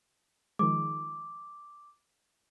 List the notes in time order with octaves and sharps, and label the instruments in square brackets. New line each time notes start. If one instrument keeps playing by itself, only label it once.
[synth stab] D#3 F3 G#3 [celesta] D6